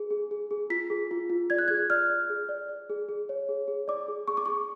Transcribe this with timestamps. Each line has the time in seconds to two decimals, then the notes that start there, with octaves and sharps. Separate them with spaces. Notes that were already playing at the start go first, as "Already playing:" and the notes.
Already playing: G#4
0.11 G#4
0.31 G#4
0.51 G#4
0.70 F4 B6
0.90 G#4
1.11 F4
1.30 F4
1.50 D5 G#6
1.58 F#6
1.68 G#6
1.70 G#4
1.90 D5 F6
2.10 D5
2.30 G#4
2.49 D5
2.69 D5
2.90 G#4
3.09 G#4
3.29 C#5
3.49 G#4
3.68 G#4
3.88 D5 D6
4.08 G#4
4.28 G#4 C#6
4.37 D6
4.46 C#6
4.48 G#4